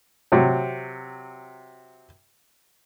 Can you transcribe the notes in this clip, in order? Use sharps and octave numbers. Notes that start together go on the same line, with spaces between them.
C3 F#3